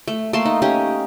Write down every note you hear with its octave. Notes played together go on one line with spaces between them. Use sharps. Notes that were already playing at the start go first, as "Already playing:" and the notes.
A3
A3 A#3 A5 C6
D#4
C#4 D#4 G4 D#5